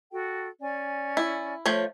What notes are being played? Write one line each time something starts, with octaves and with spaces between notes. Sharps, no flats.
F#4 A4 G5
C#4 D5 G#5
E4
F3 A3 C#5